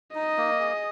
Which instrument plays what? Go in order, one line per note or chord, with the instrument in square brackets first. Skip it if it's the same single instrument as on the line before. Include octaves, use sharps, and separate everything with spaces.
[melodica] D#4 [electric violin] D#5
[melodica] A#3
G#4